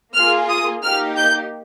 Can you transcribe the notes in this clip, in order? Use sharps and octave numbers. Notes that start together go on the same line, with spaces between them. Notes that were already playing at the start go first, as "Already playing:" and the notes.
A#3 F4 G#4 F6
D#6
A#3 D#4 G4 F6
G6